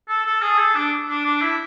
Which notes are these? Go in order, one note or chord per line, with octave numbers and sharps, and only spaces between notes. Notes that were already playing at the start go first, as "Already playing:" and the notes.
A4
A4
G#4
A4
D4
D4
D4
E4